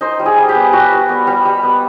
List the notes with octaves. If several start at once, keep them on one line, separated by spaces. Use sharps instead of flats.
D#4 C5
G3
G#4
G3
G4
B3
G3 F#4
G3
B3
G3
G3
B3